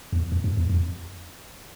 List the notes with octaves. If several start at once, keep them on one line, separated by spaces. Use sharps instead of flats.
E2
F2
G2
E2
F2